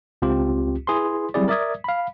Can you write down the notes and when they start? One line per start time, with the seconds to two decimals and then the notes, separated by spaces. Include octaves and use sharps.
0.22 C#2 C4 F4 G4
0.87 E4 G#4 B4 C6
1.34 F#3 G3 C4 E4 G#4 D5
1.48 A#4 D5 E5 D#6 G#6
1.84 F5 B5